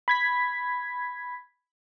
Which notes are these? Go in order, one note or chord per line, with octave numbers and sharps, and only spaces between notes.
B5 G#6 B6